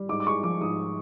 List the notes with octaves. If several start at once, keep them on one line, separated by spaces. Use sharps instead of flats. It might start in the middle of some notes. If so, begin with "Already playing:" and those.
Already playing: G3
G#2 D6
D6
G#3 C#6
F3 D6
G#2 D#6